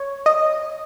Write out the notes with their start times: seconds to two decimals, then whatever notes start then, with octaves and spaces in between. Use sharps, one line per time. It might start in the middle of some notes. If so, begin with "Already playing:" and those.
Already playing: C#5
0.26 D#5